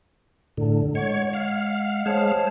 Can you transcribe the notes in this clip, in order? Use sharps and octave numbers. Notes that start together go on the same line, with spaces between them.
A2 D3
G#3 C#5 F#5
F5
G#3 C5 C#5 F5 A5